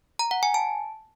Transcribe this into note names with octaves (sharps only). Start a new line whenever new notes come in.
A#5
F#5
G#5
A5